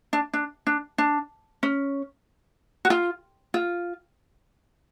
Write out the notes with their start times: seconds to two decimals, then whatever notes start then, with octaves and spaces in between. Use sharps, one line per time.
0.13 D4
0.34 D4
0.67 D4
0.98 D4
1.63 C#4
2.85 F#4
2.90 F4
3.54 F4